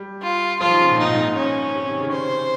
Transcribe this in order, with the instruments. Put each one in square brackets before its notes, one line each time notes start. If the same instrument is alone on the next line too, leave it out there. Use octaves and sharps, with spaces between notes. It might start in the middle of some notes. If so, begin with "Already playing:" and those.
Already playing: [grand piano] G3
[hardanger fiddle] F4
[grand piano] F3 [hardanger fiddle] F4
[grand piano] D#3
C#3
A#2
[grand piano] G#2 [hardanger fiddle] D#4
[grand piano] A#2
G#2
[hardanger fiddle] C#4
[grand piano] C3
D#3
C#3
[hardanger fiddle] C5